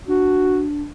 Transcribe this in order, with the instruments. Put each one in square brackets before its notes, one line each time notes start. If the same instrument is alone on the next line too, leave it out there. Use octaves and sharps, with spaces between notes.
[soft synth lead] D4 [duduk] F#4